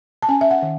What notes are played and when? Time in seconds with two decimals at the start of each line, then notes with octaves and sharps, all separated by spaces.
0.22 A5
0.29 C#4 G#5
0.41 E5
0.51 F#5
0.62 D#3